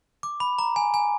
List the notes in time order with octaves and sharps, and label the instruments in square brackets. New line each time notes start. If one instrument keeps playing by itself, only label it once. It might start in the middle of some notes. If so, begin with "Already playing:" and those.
[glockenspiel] D6
B5
A#5
G#5
G#5